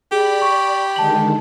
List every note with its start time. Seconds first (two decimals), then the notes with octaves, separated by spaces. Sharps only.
0.12 G4 G#4 D5 B5
0.42 C#6
0.96 D3 D#3 G#3 A5 F#7